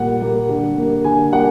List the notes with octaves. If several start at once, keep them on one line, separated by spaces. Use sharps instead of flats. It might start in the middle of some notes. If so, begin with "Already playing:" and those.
Already playing: A#2 G3 A#3 F#5
G3 A#3
D3
G3 A#3
D3 G#5
G3 A#3 F#5